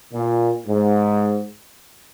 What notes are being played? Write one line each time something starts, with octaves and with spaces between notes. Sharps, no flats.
A#2
G#2